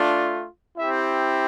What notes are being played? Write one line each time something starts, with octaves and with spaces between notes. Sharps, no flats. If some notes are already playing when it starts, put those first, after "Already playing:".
Already playing: A3 D4 F4
C4 E4 G4 E5